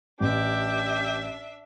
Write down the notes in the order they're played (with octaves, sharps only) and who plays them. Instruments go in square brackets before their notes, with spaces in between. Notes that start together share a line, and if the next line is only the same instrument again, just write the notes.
[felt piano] A1 [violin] D4 E5 [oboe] G4